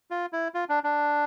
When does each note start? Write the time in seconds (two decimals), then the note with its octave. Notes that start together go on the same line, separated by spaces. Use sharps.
0.11 F4
0.33 E4
0.54 F4
0.69 D4
0.84 D4